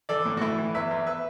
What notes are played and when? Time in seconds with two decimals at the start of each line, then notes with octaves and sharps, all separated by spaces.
0.09 E3 A4 D5
0.25 A2
0.37 F#4
0.41 E3 E4 A4
0.58 E3
0.74 E2 B4 E5
0.91 E2
1.06 B4 E5